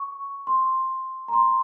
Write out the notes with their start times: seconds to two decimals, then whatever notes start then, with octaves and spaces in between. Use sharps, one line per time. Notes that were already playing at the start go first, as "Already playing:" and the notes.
Already playing: C#6
0.47 C6
1.28 A#5
1.33 C6